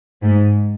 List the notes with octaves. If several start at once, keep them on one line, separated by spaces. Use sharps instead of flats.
G#2